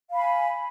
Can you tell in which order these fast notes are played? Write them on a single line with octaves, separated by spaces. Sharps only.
F5 B5 G#5